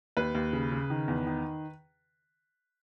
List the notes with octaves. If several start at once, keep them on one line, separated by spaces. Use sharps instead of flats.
D#2 B4
D#2
C#3
C#3
D#3
E2
D#3